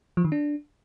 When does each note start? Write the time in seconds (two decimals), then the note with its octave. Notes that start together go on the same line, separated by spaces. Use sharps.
0.17 F3
0.25 D#3
0.32 D4